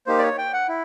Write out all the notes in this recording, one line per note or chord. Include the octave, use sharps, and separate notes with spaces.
A#3 D#4 G4 C5
D5
C#5
G5
F#5
E4